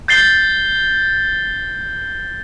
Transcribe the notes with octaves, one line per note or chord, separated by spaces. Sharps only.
G6 A6 C7 G7